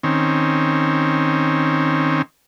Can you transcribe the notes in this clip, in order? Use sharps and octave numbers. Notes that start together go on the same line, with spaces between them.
D#3 C4 C#4